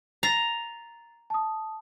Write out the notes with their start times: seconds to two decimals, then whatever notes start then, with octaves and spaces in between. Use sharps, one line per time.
0.23 A#5 A6 C7
1.30 A5 D#6